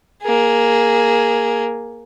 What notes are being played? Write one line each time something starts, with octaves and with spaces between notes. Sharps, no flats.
A#3 G#4